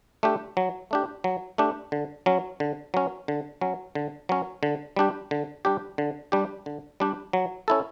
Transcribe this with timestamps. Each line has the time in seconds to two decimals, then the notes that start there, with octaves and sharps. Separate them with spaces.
0.23 A3 D4 G4
0.57 F#3
0.91 A3 D4 G4
1.24 F#3
1.58 A3 D4 G4
1.92 D3
2.26 F#3 C#4
2.60 D3
2.94 F#3 C#4
3.28 D3
3.61 F#3 C#4
3.95 D3
4.29 F#3 C#4
4.63 D3
4.96 G3 D4 G4
5.31 D3
5.65 G3 D4 G4
5.98 D3
6.32 G3 D4 G4
6.66 D3
7.00 G3 D4 G4
7.33 F#3
7.68 C#4 E4 A4